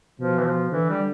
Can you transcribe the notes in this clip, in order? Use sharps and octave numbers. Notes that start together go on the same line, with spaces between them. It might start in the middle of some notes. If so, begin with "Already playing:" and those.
B2 F3
E3
F3
D3 E3
G3